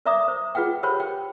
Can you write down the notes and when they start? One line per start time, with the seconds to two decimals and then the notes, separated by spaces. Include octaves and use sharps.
0.06 A#4 D5 E5 A#5 D6 D#6
0.28 C5
0.55 F4 G#4 B4 F#5 G5
0.83 G4 A#4 C5 C#5 B5
1.00 G5